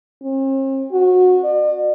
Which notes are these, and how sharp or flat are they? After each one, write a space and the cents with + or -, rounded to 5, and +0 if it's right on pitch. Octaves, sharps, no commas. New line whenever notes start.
C4 +45
F#4 -20
D5 +45